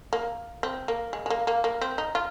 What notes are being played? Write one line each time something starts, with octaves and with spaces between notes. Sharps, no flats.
A#3
C4
A#3
G#3
G#3
A#3
A#3
A#3
C4
D#4
F4